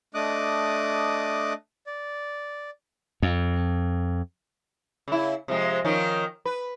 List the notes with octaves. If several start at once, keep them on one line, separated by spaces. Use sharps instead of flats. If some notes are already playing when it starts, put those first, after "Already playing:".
A3 D4 D#5 D6 D#6 F#6
D5
F2
C#3 E4
C3 F3 G#3
D#3 F3 C#4
B4